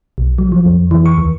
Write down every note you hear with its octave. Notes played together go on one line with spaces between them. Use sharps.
B1
F#3
F3
F2
E3
C#6
D#2